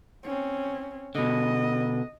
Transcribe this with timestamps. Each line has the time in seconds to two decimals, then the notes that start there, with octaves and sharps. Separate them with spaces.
0.23 C4 C#4
1.15 B2 D3 D#5